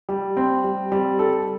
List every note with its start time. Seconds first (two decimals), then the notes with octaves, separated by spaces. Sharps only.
0.09 G3
0.37 C4
0.64 G3
0.92 G3
1.19 A4